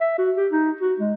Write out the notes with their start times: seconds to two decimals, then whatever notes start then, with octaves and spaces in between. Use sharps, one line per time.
0.01 E5
0.18 F#4
0.37 G4
0.52 D#4
0.81 F#4
1.00 G#3